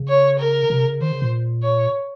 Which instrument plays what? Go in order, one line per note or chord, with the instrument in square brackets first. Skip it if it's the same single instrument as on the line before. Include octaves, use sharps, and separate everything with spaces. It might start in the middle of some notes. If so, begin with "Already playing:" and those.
Already playing: [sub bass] C#3
[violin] C#5
A#4
[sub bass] C3
C#3
[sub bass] D#3 [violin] C5
[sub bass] C#3
A#2
[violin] C#5